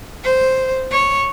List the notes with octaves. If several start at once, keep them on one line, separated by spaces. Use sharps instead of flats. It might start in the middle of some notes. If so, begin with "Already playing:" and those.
C5
C#5